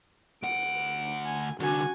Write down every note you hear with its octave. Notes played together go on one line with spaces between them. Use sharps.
D2 F#5 D7
G#5
C2 D3 F#4 G#5